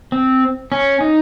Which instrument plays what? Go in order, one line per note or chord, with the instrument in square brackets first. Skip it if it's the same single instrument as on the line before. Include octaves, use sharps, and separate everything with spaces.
[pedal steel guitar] C4
C#4
D#4